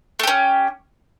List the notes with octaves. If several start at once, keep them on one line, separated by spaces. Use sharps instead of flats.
A3 C#4 G4